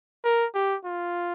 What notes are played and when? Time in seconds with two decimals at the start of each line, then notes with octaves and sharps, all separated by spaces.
0.24 A#4
0.55 G4
0.85 F4